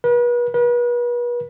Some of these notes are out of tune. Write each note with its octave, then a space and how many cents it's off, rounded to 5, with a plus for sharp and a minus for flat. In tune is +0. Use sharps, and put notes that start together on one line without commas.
B4 -40
B4 -40